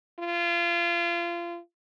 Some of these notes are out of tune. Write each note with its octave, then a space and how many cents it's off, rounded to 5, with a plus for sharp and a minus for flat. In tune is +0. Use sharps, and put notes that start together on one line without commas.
F4 -30